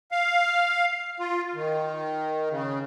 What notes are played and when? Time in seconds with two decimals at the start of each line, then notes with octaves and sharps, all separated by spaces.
0.12 F5
1.20 F4
1.54 D#3
2.50 C#3